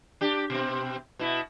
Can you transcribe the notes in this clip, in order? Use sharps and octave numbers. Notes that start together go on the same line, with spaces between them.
D4 G4
B2 C4
B2 E4